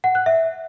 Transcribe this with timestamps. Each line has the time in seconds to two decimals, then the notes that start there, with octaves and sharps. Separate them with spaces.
0.04 F#5
0.15 F#6
0.26 E5